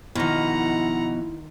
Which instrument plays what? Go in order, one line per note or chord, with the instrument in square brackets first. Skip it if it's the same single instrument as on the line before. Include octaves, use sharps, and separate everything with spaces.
[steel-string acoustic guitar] B2 F3 [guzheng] D#3 F4 [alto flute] E4 [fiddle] F#5 A#5